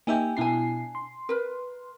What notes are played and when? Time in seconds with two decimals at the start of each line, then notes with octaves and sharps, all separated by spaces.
0.07 A#3 D#4 G4 E5 G#5
0.37 B2 D4 E4 G#5 C7
0.95 C6
1.29 A#4 B4